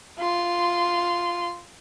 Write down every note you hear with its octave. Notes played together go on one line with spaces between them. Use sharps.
F4 C6